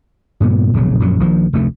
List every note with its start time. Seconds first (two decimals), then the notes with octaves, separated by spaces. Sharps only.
0.40 G2 A#2 C#3 B3
0.74 E1 A#1 C#3 F#3
1.00 A#1 F#2 D#3 F#3
1.20 A#1 D#3 F3
1.53 F1 D2 A3